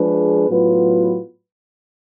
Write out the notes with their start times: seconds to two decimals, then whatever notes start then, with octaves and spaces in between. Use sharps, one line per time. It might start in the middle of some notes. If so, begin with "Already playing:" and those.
Already playing: F3 G#3 D4 G#4 B4
0.49 A2 F#3 B3 F4 B4